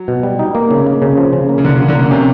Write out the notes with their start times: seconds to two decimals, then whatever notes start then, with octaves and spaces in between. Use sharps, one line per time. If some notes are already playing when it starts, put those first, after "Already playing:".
Already playing: F#3
0.08 B2
0.23 G3
0.39 D#4
0.55 A#3
0.71 C#3
0.87 A#3
1.02 C#3
1.17 F3
1.33 C#3
1.49 A#3
1.58 C#3
1.64 D3 A#3
1.76 C#3
1.80 F#4
1.88 D3
1.95 C#3 A#3
2.11 C3 C#4